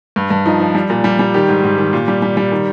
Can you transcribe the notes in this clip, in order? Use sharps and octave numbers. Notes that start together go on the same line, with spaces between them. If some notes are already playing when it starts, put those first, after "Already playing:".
G2
G2
F3 D#4
F3
G3
A#2
G3
G3
D#3 G4
G#2
G#2
D#3
A#2
G3
G3
G3
D#3